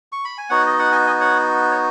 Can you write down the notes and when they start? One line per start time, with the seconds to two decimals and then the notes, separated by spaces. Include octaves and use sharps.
0.12 C#6
0.25 B5
0.38 G#5
0.50 B3 D#4 F#4 C#5 F#5
0.66 D#5
0.79 F#5
0.92 D#5 G#5
1.07 D#5 G#5
1.20 C#5 F#5
1.71 C#5